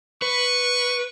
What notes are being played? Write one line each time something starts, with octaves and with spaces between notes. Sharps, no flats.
B4 C#6